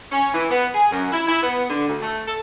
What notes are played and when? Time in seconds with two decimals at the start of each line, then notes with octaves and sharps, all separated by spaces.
0.11 C#4
0.33 E3
0.50 B3
0.73 G#4
0.91 F#2
1.12 E4
1.27 E4
1.42 B3
1.70 D3
1.88 D2
2.02 A3
2.27 A4